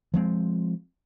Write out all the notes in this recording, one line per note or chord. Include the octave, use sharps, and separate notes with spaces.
F3 G#3 C4